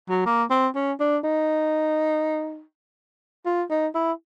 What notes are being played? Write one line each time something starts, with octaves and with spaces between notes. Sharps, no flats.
F#3
A#3
C4
C#4
D4
D#4
F4
D#4
E4